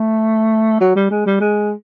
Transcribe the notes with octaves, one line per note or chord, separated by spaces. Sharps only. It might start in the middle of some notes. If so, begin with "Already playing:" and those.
Already playing: A3
F#3
G3
G#3
G3
G#3